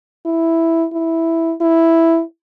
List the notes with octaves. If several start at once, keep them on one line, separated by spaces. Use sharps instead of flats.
E4
E4
E4